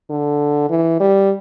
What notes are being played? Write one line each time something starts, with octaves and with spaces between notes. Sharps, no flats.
D3
E3
G3